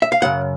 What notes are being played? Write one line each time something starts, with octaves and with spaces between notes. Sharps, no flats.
E5
F5
F#2 C#3 F#5